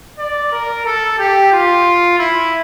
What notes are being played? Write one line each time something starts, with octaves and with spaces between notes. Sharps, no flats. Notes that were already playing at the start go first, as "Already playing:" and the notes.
D5
A#4
A4
G4
F4
E4